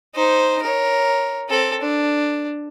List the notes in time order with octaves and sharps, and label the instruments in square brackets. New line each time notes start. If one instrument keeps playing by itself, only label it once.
[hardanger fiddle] D#4 C5
A#4 C#5
C4 A4
D4